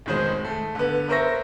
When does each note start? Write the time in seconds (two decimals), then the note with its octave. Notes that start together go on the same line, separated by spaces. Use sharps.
0.06 F1 B2 D#3 G#3 C5
0.45 A3
0.75 D3 B3
1.08 B3 A#4 C5 E5 C#6 A#6